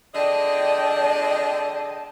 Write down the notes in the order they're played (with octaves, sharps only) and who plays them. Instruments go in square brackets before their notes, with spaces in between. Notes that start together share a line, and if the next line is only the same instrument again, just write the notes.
[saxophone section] D3 G#4 D#5 [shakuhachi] D5 [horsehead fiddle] G5 A5